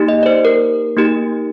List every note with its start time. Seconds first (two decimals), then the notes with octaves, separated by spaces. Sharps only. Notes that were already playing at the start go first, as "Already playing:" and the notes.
Already playing: A#3 D#4 G4
0.08 D#5
0.23 D5
0.26 C5
0.45 A#4
0.97 A#3 D#4 G4